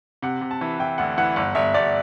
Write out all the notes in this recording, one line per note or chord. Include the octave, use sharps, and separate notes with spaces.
C3 F#5
C3
A5
E3
E3 G5
D2 F#5
E3 F#5
G1 F#5
G1 E5
G1 D5